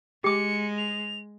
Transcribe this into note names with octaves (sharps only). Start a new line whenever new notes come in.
G#3 G4 D6 C#7
F7